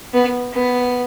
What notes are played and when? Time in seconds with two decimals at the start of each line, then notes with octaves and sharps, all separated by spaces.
0.14 B3
0.53 B3